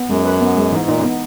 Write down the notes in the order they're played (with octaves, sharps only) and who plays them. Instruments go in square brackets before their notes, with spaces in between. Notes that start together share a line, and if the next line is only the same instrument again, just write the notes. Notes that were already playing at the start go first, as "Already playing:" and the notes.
Already playing: [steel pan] B3
[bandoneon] F#2 [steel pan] G#3
[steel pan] B4
B3
G#3
[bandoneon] G#2 [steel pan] E3
[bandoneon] A#2 [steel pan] D#4
[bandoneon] F#2
[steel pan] B3